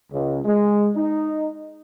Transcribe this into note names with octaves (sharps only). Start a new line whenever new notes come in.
C#2
G#3
D#4